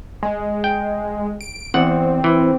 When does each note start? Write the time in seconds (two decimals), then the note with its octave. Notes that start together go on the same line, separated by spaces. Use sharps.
0.23 G#3
0.64 G5
1.41 D7
1.74 E2 C4 F#5
2.24 E3